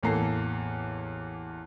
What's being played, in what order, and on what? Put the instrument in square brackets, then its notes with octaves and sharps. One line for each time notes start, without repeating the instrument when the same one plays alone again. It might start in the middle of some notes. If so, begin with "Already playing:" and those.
[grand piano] A1 E2 A#3 A4 A#5 C7